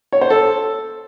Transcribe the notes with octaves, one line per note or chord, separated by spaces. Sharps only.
C#5
C5
A4